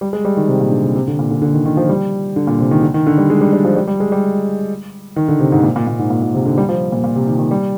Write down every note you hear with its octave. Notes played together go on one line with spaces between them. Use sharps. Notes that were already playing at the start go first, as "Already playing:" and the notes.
G3
G#3
G3
D#3
C3
A#2
D3
C3
C3
D3
A#2
D3
D3
D#3
D#3
F3
G3
D3
A#2
C3
D#3
D3
D#3
D3
G3
G#3
G3
G3
F3
G3
G3
G#3
G3
D#3
D3
C3
G#2
A#2
A#2
A#2
G#2
A#2
A#2
C3
D3
G3
F3
A#2
A#2
C3
D#3
D#3
G3